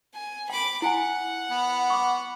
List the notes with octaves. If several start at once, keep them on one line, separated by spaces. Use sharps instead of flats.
G#5
G5 B5 D6
E4 F#5 G#5
B3
C#6 D6